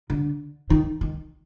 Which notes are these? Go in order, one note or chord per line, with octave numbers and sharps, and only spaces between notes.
D3
D#3
D#3